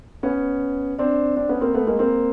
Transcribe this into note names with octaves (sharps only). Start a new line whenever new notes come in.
B3 C#4
C4 D4
C4 D4
B3 C#4
A#3 C4
A3 B3
G#3 A#3
A#3 C4